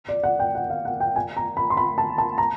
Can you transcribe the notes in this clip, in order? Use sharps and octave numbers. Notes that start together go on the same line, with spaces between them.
D5
F#5
G5
F#5
F5
F#5
G5
G#5
A#5
B5
C6
B5
A5
A5
A#5